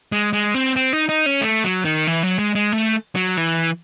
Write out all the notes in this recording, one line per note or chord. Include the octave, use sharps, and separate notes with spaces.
G#3
G#3
C4
C4
D#4
D#4
C#4
A3
F#3
D#3
E3
F#3
G#3
G#3
A3
F#3
E3